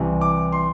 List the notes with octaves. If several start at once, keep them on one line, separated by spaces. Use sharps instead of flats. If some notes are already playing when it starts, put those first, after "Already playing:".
Already playing: C2 C3 E3
D6
C6